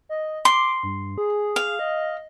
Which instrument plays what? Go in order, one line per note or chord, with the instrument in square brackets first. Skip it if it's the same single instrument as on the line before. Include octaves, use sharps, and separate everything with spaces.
[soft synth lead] D#5
[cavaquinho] C6 [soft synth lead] D6
[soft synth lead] G2
G#4
[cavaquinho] F5
[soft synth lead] D#5